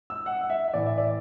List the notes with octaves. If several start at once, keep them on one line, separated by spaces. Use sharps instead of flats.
E6
F#5
F#5
E5
E5
A2 E3 D5
E5
D5